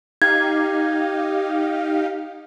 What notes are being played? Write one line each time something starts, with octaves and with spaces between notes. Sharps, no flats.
D#4 G4 F5 G#6